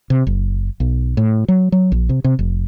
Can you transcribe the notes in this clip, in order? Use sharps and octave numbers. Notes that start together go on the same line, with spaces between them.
C3
F#1
B1
A2
F#3
F#3
A#1
C3
C3
F1